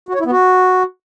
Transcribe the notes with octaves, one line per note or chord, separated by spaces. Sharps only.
F#4
C#5
E4
B3
F#4